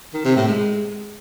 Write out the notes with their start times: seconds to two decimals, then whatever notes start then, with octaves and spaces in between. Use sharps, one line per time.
0.14 D#3
0.25 C3
0.36 A2
0.47 G#3